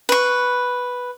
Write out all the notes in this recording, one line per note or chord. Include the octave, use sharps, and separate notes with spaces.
B4 C#6